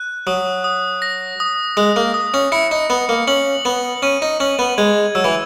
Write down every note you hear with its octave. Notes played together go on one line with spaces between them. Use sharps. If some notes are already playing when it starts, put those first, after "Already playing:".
Already playing: F#6
F#3 D#6
D#6
A#6
D#6
G#3 D#6
A#3
D#6
C#4
E4 C#7
D#4
B3 D#6
A#3
C#4 F#7
B3 F#7
C#4 D#7
D#4
C#4 F#7
B3
G#3 G#6
F#3 E6
E3